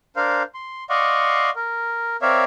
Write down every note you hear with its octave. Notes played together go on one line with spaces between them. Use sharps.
D4 A#4 C5 F5
C6
D5 D#5 F5 F#5 C6 C#6
A#4
C4 A#4 C#5 D5 E5 F5